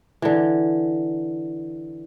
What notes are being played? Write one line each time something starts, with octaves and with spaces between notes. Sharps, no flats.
D3 E3